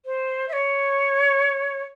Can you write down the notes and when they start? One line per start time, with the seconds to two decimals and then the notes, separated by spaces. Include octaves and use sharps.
0.06 C5
0.48 E5
0.53 C#5